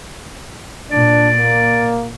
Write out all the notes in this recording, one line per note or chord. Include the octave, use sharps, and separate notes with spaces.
A#2 D4 D5
A#3